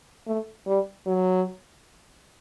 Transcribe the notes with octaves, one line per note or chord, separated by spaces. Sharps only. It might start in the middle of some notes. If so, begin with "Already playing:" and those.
A3
G3
F#3